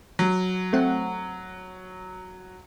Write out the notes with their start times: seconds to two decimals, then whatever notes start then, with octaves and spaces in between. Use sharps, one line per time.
0.19 F#3
0.73 A3 C4 F#5